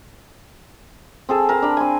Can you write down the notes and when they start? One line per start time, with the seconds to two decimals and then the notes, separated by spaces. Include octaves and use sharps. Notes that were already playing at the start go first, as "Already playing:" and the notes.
1.29 C4 G#4 A4
1.49 A#4 A5 A#5
1.62 D4 B5
1.77 C4 G#5